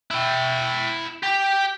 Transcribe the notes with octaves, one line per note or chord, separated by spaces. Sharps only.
E4 G5
G4